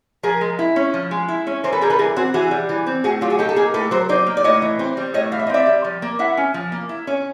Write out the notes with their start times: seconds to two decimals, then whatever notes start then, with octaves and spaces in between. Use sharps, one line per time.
0.23 F3 G#4 A#4
0.41 G#3
0.59 E4
0.76 C#4
0.94 F3
1.11 G#3
1.28 E4
1.47 C#4
1.64 E3 A#4 C5
1.72 A4 B4
1.81 G3 G#4 A#4
1.90 A4 B4
1.99 E3 G#4 A#4
2.16 C4 F#4 G#4
2.34 E3 F#4 G#4
2.51 G3
2.69 E3
2.87 C4
3.04 A2 F#4 G#4
3.21 F#3 F4 G4
3.30 F#4 G#4
3.39 D#4 G4 A4
3.49 A4
3.56 A#3 G#4 A#4
3.74 A2 A4 B4
3.91 F#3 A#4 C5
4.09 D#4 C5 D5
4.27 A#3
4.37 D5
4.44 A2 C#5 D#5
4.62 E3
4.79 C4
4.97 G3
5.14 A2 C#5 D#5
5.32 E3 F5
5.39 E5
5.47 D#5
5.49 C4 D5 E5
5.67 G3
5.84 F3
6.02 A#3
6.19 E4 E5 F#5
6.37 C#4
6.54 F3
6.72 A#3
6.89 E4
7.07 C#4